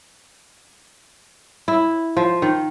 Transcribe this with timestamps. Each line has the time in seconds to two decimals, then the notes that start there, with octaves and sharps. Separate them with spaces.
1.68 E4
2.17 F3
2.42 D#3